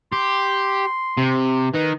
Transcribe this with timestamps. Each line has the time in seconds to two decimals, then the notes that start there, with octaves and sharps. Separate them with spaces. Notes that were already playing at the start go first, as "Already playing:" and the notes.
0.12 G4 C6
1.17 C3
1.74 D#3 D#4 B4